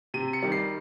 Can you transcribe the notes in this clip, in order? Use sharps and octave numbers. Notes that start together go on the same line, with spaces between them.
C3 D#7
C#7
D#3 G3
C7